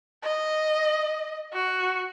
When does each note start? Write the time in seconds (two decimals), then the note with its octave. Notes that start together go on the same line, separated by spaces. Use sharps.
0.23 D#5
1.53 F#4